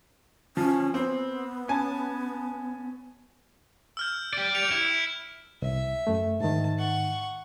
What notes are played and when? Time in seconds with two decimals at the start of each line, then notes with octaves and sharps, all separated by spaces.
0.57 F3 C#4
0.94 B3 C4
1.68 C#4 G#5 A5
3.97 E6 F6 G6
4.33 G4 D5
4.55 C#7 D7 F7
4.72 E4
5.62 C2 E5
6.07 F#2 A3
6.40 G#2 D#3 A5
6.78 F#5 C#6